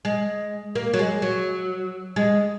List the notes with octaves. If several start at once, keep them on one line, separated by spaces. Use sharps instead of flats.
G#3
A#3
F#3
G#3
F#3
G#3